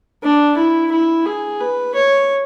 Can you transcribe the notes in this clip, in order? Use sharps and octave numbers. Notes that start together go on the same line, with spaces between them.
D4
E4
E4
G#4
B4
C#5